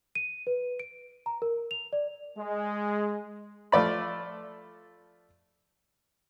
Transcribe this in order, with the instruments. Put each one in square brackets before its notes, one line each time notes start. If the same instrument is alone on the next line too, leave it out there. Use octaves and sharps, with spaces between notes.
[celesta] D#7
B4
D7
A#5
A#4
F7
D5
[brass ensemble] G#3
[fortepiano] F3 A3 D5 B5